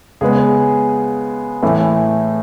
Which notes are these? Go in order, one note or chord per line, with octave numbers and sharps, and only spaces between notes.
C#3 G#3 B3 G#4
A2 E3 A3